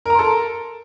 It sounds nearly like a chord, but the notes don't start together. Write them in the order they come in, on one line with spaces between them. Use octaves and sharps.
A#4 A#5 C6 A4